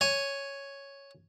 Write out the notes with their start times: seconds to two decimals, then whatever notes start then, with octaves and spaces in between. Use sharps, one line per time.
0.01 C#5 G#5